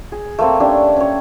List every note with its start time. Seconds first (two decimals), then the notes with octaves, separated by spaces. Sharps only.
0.12 G#4
0.39 A3 A#3 C4
0.60 C#4 D4 G4
0.96 C#4 C#5